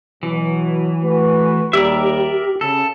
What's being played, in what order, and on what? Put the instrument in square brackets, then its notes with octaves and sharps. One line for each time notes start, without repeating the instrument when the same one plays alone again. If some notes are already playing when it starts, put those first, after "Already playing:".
[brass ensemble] B2 F#3 [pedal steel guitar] E3
[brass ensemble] A3 F#4 B4
[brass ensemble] D#2 G3 [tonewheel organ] G4 [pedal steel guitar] A#4 D5 E5
[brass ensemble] C#3 [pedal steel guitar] A4